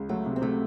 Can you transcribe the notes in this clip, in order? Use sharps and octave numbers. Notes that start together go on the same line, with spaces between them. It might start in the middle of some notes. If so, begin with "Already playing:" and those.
Already playing: C#2
F#3 A3
C3
C4
C3 A3